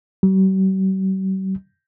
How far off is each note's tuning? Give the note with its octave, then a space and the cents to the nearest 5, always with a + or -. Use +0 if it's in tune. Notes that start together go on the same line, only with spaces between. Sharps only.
G3 -45